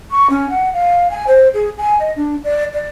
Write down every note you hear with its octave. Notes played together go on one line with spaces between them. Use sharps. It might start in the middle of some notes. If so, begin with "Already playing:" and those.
C#6
C#4
F#5
F5
G#5
C5
G#4
G#5
D#5
D4
D5
D5